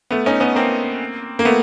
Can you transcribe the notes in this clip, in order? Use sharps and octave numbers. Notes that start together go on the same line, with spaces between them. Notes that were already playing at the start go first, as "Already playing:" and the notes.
A3 B3
C#4 D#4
B3 C#4
A#3 C4
A#3
A3 B3